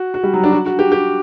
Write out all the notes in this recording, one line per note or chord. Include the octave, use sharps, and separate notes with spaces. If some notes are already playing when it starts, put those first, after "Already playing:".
Already playing: F#4
F#4
G3
F#3
D4
F#4
F#4
G4
G4